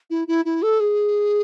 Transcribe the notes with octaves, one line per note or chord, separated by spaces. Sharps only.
E4
E4
E4
A4
G#4